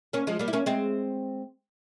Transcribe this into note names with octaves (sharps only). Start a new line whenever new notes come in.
A#3 C#4
F3 G#3
G3 A#3
E4
A#3 C#4
G#3 C4